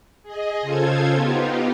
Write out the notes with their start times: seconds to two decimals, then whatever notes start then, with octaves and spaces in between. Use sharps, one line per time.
0.23 G#4 D#5
0.62 C#3 F4 A4 C5 G#6
1.14 B3 D#4 F4 G4